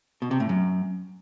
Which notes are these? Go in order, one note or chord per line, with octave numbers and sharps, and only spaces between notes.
B2
C3
A2
F#2